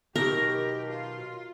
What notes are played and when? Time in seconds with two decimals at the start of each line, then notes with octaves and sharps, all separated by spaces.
0.16 B2 D#3 F#3 G4 A#4
0.91 F4